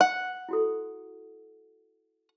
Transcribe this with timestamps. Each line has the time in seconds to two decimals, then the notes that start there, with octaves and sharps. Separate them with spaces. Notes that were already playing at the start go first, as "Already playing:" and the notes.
0.01 F#5
0.49 E4 F#4 A4